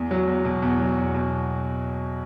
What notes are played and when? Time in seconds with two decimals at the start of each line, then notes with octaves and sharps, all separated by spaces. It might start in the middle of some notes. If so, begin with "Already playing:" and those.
Already playing: E2
0.11 F#3
0.27 E2
0.45 B2
0.62 E2
0.80 F#3
0.97 E2
1.14 B2